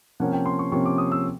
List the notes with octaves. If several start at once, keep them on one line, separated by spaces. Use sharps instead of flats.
C3 F3 A#3 C#4 F#5
G5
C6
C#6
C3 F3 A#3 C#4 C#6
D6
D#6
E6